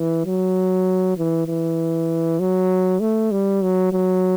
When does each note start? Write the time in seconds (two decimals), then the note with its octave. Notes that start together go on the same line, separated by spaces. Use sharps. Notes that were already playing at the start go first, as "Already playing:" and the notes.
Already playing: E3
0.25 F#3
1.17 E3
1.47 E3
2.39 F#3
3.00 A3
3.31 G3
3.62 F#3
3.93 F#3